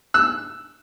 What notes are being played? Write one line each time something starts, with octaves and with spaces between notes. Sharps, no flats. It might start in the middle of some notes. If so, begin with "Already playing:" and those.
E6 F#6